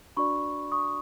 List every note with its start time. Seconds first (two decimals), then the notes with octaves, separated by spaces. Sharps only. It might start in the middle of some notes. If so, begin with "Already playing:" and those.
0.17 D4 F#4 B4 D5 B5 C#6
0.72 C#6 D#6